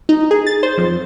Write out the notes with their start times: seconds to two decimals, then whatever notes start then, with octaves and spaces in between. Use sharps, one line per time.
0.09 D#4
0.31 G#4
0.47 A6
0.63 C5
0.78 F2